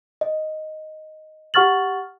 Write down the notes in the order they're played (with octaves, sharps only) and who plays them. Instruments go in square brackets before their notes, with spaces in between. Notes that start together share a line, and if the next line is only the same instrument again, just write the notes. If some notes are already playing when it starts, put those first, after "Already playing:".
[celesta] D#5
G4 F#5 C#6 F6 A6 F#7